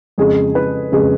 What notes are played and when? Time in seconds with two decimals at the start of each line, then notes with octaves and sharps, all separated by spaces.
0.18 F2 C#3 G#3 G#4
0.55 B4
0.92 F2 C#3 G#3 G#4